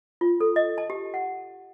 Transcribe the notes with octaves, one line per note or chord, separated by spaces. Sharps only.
F4
A4
D#5
A5
G4
F#5